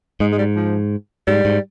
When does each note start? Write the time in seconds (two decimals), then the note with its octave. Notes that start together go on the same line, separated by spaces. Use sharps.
0.20 G#2 G#3
0.32 G#3
0.38 G3
0.56 F3
1.27 G#2 G3
1.45 G#2